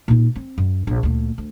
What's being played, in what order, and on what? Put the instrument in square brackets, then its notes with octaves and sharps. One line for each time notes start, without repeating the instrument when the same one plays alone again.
[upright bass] A#2 D#4
C4
F#2
A#1
D2 A#2
D2